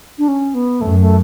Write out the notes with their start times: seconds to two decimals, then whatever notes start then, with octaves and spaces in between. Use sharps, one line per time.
0.18 D4
0.28 C#4
0.54 B3
0.81 F#2 A3
1.00 A3